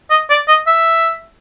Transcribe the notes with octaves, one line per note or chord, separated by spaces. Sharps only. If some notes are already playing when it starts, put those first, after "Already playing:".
D#5
D5
D#5
E5